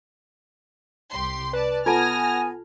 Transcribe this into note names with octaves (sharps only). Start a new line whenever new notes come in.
C2 G4 C6
B4 D5 A5
B3 F4 A4 G#5 A5 F6 G#6 A#6